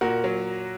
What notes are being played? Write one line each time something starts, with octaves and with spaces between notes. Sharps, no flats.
A#2 F#4 A#4
F#3